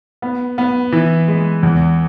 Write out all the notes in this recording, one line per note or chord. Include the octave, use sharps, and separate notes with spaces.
B3
B3
E3
G#3
E2